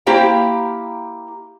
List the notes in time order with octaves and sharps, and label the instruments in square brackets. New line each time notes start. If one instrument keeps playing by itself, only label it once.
[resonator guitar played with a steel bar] A#3 E4 G4 C5 G5 A#5